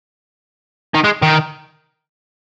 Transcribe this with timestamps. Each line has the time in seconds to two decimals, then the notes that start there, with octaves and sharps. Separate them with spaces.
0.94 D#3
1.04 G#3
1.22 D#3